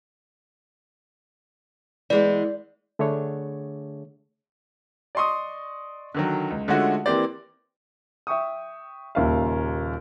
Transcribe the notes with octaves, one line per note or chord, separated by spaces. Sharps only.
E3 G#3 B3 D5
D3 A3 D4 G#4 C#5
D5 D#5 C6 C#6 D#6
D3 D#3 F#3
C#2
D3 G#3 A3 C#4 F4 F#4
E3 A#3 C4 G4 C5 D5
E5 G5 C#6 D#6
D#1 D#2 C#3 E5 F5